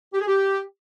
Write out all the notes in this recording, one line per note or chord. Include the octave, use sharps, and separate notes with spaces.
G4
G#4
G4